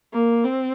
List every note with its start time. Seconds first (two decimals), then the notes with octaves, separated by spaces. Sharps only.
0.13 A#3
0.44 C4